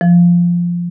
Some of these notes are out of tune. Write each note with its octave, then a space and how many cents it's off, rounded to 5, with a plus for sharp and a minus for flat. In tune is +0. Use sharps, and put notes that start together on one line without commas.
F3 -5